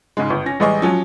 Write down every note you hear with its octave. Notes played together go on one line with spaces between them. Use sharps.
G#2 C#3 G#3
G1
C#4 A#6
A1 G3 G#3 G#4 D#5 C#6
F3 F#3 C#4